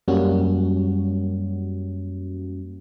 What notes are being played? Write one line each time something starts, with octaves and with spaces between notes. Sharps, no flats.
F#2 G3 A#3 C#4 F#4